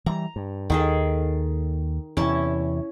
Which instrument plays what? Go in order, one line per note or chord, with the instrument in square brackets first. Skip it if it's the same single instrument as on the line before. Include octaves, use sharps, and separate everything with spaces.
[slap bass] E3 G3 [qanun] A#5
[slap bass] G2
[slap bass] D#2 [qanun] D#3 G#4 A4
[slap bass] E2 C3 [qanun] C#4 E4 A5